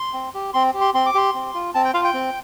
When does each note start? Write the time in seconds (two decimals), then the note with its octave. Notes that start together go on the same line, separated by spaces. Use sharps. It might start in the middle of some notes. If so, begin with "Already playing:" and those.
Already playing: C6
0.13 C4
0.34 G4
0.54 C4 C6
0.74 G4
0.81 C6
0.94 C4 C6
1.06 D6
1.14 G4 C6
1.35 C4
1.54 F4
1.74 C4 A5
1.85 G5
1.94 F4 F5
2.04 G5
2.14 C4